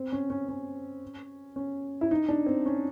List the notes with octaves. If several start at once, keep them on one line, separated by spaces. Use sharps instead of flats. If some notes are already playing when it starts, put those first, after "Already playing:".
Already playing: C4
C#4
C#4
C#4
C#4
E4
D#4
D4
C4
C#4